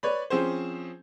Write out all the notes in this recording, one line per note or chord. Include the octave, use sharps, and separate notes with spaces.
B4 C#5 D5 B5
F3 C4 C#4 G#4 C5